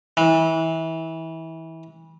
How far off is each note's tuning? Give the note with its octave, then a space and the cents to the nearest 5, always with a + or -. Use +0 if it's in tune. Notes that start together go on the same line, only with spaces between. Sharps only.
E3 -25